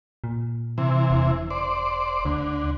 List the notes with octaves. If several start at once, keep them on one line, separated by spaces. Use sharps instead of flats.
A#2
C3 E3
E1
C5 D5
D2 D3